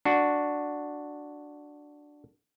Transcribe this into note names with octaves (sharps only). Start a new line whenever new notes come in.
D4 F#4